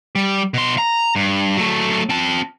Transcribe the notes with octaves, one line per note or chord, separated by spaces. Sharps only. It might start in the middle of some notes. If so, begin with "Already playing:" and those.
G3
B2 C6
A#5
G2
F#3 A3
C4 A5